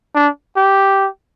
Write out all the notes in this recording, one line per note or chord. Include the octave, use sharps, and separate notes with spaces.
D4
G4